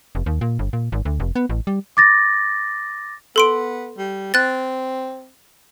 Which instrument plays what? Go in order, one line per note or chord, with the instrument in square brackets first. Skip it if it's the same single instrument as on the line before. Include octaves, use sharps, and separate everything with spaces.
[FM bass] F1
D#2
A#2
G1
A#2
G#1
D2
F1
B3
A1
G3
[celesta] D6 A6 A#6
[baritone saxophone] B3 [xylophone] A4 C6 D7
[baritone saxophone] G3
[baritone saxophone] C4 [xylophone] F#6 A6